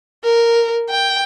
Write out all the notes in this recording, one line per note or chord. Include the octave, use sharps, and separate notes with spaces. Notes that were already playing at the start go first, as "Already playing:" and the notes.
A#4
G5